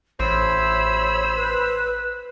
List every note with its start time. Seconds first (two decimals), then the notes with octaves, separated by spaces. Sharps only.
0.20 A1 C5 C#5 B5 E6
1.36 B4